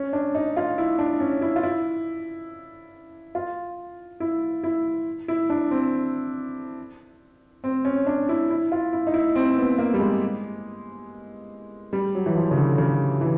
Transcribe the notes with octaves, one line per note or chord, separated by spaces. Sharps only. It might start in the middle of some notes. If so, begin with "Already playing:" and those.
Already playing: C#4
D4
D#4
F4
E4
D4
C#4
E4
F4
E4
F4
E4
E4
E4
D4
C4
C4
C#4
D4
E4
E4
F4
E4
D#4
E4
C4
B3
A#3
G3
G#3
G3
F#3
E3
F3
C#3
D3
C#3
E3